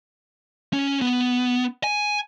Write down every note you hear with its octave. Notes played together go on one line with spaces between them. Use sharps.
C#4
B3
G#5